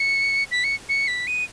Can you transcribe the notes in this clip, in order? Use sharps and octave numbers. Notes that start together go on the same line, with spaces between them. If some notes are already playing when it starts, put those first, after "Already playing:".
Already playing: C#7
B6
C#7
C#7
B6
D#7